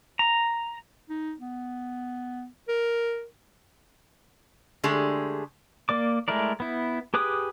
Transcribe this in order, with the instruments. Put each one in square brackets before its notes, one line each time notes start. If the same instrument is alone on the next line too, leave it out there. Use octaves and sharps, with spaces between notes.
[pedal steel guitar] A#5
[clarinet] D#4
B3
A#4
[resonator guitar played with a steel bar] D3 G#3 A3 G4 G#4
[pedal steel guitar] A#3 D5 D6
G#3 A3 E4 A#4 D5
B3 E4
G4 G#4 B4 D6 D#6